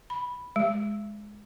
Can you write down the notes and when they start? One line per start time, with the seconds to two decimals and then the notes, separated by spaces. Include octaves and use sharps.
0.10 B5
0.56 G#3